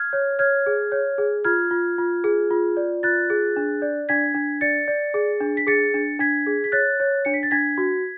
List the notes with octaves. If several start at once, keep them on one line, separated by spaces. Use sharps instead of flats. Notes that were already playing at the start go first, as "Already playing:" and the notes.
Already playing: F6 G#6
C#5
C#5 F6 G#6
G#4
C#5
G#4
F4 F6 G#6
F4
F4
G#4
F4
D5
F4 F#6 A6
G#4
D4
D5
D4 G#6 B6
D4
D5 A6 C#7
D5
G#4
D4
B6
G#4 A6 C#7
D4
D4 G#6 B6
G#4
B6
C#5 F#6 A6
C#5
D4 C#7
B6
A6
D4 G#6 B6
F#4